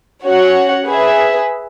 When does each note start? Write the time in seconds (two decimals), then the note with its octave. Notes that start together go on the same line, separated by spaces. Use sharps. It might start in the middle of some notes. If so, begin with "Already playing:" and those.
0.24 C#4 F#4 C#5 F#5
0.85 G#4 B4 E5